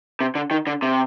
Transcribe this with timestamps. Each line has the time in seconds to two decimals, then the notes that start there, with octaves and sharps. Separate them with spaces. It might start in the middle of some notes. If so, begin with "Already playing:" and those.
0.21 C3
0.35 D3
0.51 D#3
0.67 D3
0.82 C3